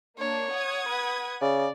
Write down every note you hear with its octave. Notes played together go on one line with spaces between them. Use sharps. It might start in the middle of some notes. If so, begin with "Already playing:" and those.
A#3 D4 C#5
F#5 D#6 G#6
B4
C#3 D5